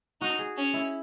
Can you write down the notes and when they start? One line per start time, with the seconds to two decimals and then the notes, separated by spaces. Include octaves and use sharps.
0.21 D#4 F#4
0.39 G#4
0.57 C#4
0.74 E4